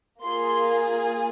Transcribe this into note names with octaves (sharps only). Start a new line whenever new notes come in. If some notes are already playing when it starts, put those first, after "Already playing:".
A#3 F4 G#4 C6